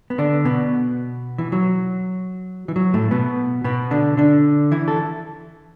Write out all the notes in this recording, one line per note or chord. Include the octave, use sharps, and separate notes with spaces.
B3
D3 D4
B2 B3
E3
F#3
E3
F#3
A2 A3
B2 B3
B2 B3
D3 D4
D3 D4
E3 E4
A4